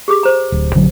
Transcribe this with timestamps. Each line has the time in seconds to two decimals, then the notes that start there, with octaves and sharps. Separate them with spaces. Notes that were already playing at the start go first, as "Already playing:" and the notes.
0.08 G4 G#4 D6
0.23 C5 A#5
0.52 D1
0.75 A#1 D3 F#3